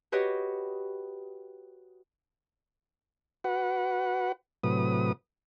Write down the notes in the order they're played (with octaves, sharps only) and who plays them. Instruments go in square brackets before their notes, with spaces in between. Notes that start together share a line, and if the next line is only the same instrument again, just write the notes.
[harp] F#4 G4 B4 C#5 D#5 G5
[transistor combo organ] F#4 B4 F#5
A2 C3 F#3 B4 D#6